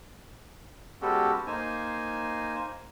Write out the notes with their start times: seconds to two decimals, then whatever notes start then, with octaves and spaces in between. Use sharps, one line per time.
1.02 G#3 B3 C#4 F#4 G4 A4
1.47 A#3 D#4 C5 G#5